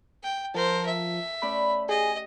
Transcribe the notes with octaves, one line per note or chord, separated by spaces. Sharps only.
G5
F3 A#4 C5 A5
E5
A3 C#4 D5 B5
G4 G#4 D#5